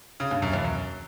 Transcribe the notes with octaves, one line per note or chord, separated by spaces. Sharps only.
C#3
G2
F#2
E2
F#2